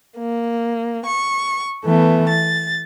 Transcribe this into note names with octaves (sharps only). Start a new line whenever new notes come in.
A#3
C#6
E3 A3 B3
A6